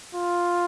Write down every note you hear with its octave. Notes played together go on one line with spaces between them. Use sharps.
F4